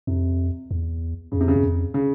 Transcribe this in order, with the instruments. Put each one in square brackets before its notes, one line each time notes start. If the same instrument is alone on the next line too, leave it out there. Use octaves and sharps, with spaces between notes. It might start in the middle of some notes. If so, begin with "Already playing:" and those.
[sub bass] F2 [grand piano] C3
[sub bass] E2
[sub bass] F2 [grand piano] C#3
[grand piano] C3
C#3
[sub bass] F#2
F2
[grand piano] C#3